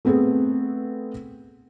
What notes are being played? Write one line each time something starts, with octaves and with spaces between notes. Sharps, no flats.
A3 B3 C4 G#4 A4 B4